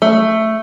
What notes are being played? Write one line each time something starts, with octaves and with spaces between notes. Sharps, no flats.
A3